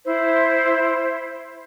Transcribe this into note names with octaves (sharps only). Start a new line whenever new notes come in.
E4 C5